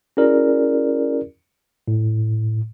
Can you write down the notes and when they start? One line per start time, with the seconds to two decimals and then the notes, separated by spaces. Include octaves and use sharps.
0.17 C#4 E4 F#4 G#4 A#4 D5
1.88 A2